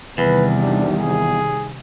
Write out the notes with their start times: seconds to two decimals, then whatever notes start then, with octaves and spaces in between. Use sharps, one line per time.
0.18 E2 C3 D#3 G3 B4
0.62 D4
0.99 G#4